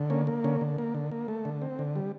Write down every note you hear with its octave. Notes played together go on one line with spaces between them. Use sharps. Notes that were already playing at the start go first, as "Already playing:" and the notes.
Already playing: D3
A#3 C#4
A#3
D3 C#4
D3
A#3
D3
A#3
A3
D3
C4
D3
G3